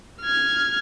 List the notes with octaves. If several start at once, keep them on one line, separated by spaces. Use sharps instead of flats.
F6 G#6